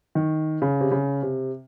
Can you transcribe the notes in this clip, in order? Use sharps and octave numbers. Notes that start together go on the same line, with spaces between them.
D#3
C#3
C3
C#3
C3